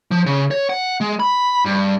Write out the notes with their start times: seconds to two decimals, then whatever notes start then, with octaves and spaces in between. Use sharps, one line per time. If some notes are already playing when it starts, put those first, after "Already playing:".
0.11 F3
0.26 C#3
0.51 C#5
0.70 F#5
1.01 G#3
1.20 B5
1.65 G2